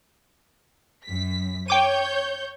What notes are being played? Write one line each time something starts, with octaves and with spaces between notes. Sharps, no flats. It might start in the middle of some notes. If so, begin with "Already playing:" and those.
F#2 B6
C#5 G5 D6 G6 D#7